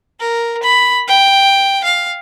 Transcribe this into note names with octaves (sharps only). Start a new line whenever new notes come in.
A#4
B5
G5
F5